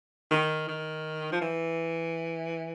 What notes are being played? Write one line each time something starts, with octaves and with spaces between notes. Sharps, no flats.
D#3
D#3
F3
E3